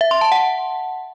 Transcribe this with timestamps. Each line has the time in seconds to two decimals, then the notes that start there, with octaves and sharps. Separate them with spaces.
0.01 E5
0.11 C6
0.21 A5
0.32 F#5